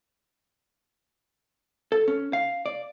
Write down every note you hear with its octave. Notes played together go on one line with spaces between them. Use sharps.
A4
C#4
F5
D5